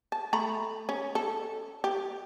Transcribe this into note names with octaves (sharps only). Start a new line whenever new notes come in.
A5
A3 A#5 B5
C#4
A4
G4